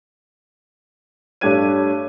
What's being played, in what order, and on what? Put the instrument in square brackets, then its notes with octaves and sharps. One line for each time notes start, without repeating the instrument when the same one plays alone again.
[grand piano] G2 A3 G4 C#5 G#6 D#7